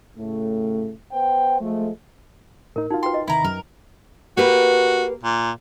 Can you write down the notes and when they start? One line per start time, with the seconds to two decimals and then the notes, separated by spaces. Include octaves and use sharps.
0.17 A2 C#3 A3
1.12 B3 C5 G5
1.61 F3 G#3 A3
2.76 A2 D#4 A#4
2.91 D#4 F4 F#4
3.03 B4 G5 C6
3.14 D#5
3.28 D#2 C3 D#3 E4 A#5
3.44 F#2 A#4
4.37 A#3 F#4 G4 B4
5.23 A#2